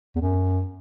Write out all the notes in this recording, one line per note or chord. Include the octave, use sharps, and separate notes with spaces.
E2
F#2